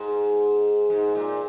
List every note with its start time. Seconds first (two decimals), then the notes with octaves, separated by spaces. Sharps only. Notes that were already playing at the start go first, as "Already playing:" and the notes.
Already playing: G#2
0.90 G#2
1.15 A#2